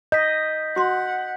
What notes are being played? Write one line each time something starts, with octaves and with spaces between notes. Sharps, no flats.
D#5 G6 B6
F#4 F#5 C6